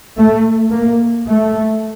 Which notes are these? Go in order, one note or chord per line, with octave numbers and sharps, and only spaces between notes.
A3
A#3
A3